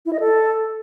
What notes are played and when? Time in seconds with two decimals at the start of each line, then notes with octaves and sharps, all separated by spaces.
0.06 E4
0.13 D#5
0.20 A4